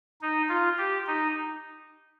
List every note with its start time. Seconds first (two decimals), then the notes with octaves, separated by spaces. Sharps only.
0.21 D#4
0.49 F4
0.78 G4
1.07 D#4